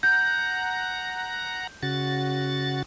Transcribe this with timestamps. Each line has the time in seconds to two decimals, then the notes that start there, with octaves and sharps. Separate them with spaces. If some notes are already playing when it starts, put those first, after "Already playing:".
0.03 F#5 A#5 G6
1.83 C#3 F#4 A6